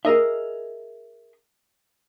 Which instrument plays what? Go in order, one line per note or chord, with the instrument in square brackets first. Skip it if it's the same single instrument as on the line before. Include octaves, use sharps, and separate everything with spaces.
[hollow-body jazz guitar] G#4 A#4 D#5 E5